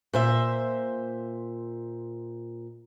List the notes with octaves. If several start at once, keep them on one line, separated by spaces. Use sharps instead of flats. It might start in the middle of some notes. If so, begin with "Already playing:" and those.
A#2 C5 E5